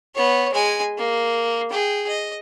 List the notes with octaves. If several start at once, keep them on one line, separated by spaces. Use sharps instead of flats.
B3 C#5
G#3 G#5
A#3
G#4 G5
D#5